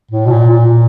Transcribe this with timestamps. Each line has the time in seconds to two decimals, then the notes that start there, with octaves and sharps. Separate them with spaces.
0.11 A2
0.26 B2
0.31 A#2
0.50 A#2